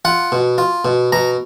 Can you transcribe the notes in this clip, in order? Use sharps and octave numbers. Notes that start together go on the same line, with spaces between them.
F4 F#5
B2
F4
B2
B2 A#5